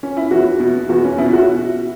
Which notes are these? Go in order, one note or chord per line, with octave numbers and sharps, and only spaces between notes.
C#4
E4
E2 F#4
B2
E2 F#4
C#4
B2 E4
F#4